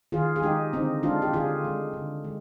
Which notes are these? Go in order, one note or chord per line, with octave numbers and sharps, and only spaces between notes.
D#3 F4 G#4
G#4
G#3 D#4 G4
D3 C4 D#4
G#3 D4 F4
G4
D3 F4 G#4
G#3
D3
G#3